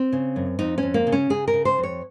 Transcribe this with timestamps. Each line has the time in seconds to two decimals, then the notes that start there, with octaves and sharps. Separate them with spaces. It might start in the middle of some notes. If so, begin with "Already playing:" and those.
Already playing: C4
0.13 C#3
0.36 F#2
0.59 F2 D#4
0.78 C#4
0.83 F2
0.94 A#3
1.07 C#3
1.12 C#4
1.30 C#3 G#4
1.48 A#4
1.54 C#3
1.65 C5
1.78 F2
1.83 C#5